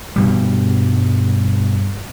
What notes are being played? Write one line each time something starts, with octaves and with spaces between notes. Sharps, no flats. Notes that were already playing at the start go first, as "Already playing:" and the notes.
G2 B2 G3